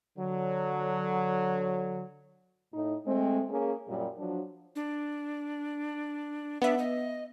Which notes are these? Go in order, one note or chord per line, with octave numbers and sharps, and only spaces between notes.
D3 F#3
A2 D#4
G#3 A3 C4
A#3 C#4 G#4
F#2 A#2 G3
F3 F#3 D4
D4
B3 D4 E5
D#5